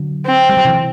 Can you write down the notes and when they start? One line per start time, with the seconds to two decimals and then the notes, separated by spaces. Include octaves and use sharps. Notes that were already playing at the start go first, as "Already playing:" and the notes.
Already playing: D3 F#3
0.26 C4
0.49 G3
0.57 F#3
0.65 C3 E3